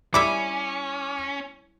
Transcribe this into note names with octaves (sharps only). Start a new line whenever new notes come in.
G3 C#4 E4 E5 D6